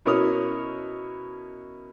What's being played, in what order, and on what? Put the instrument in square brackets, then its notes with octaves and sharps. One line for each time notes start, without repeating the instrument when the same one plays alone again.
[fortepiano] B2 C#4 E4 A#4 C#5 D#6